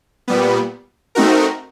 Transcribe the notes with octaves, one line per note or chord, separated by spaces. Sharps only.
A#2 G3 B3
A3 C4 D#4 F#4 A#4